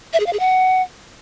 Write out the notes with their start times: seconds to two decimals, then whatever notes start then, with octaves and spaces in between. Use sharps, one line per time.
0.13 E5
0.20 G#4
0.26 F5
0.33 G#4
0.40 F#5